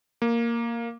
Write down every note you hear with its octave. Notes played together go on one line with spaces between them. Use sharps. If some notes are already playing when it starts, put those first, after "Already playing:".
A#3